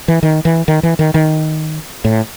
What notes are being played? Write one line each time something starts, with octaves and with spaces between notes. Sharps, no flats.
E3
D#3
E3
D#3
E3
D#3
D#3
A2